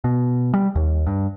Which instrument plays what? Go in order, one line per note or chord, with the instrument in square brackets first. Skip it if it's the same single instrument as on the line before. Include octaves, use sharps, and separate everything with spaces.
[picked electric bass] B2
G3
D#2
G2